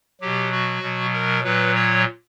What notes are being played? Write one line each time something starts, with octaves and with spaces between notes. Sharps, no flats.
B2 F#3 G4
F#4
B2 F#3
A#4
A#2 F#3 B4
C#5